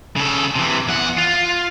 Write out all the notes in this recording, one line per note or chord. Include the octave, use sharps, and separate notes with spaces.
C#3 A4
C3 E3
E2 F#5
F4